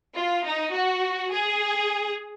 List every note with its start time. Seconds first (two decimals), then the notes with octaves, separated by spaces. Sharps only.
0.15 F4
0.44 D#4
0.73 F#4
1.31 G#4